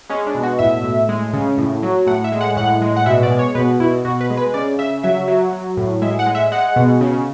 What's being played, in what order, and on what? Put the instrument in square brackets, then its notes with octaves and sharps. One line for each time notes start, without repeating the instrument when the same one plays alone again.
[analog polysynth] G#3 C#4
D4
B2
F#4
A2 E5
A2
G#3
C#3
A2
F#3
A2 F#5
E5
G#3
F#5
A2 F#5
G#3
F#5
B2 E5
D5
G#3
C#5
B2 B4
B2 E4
B2 F#4
B4
G#3
B4
C#3 D5
C#3 E5
F#3 E5
F#3
F#3
A2
G#3 E5
F#5
G#3
E5
G#3 F#5
B2
C#3